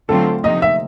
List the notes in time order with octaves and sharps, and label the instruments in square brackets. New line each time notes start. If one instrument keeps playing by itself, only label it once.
[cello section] D3 F#3 A3 C4 F4 [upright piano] A4
[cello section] C3 F3 A#3 D#4 [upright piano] D#5
[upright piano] E5